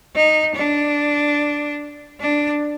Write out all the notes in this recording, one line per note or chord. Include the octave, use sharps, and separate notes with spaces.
D#4
D4
D4